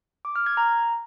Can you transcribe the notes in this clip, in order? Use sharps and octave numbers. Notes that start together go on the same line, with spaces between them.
D6
F6
G#6
A#5